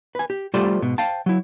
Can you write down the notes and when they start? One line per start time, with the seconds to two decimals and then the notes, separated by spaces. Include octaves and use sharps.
0.15 B4 G#5
0.30 G4
0.54 G3 A3 F4 A4 C5 D5
0.82 G#2 B2
0.98 C5 F5 G5 A5
1.26 F#3 E4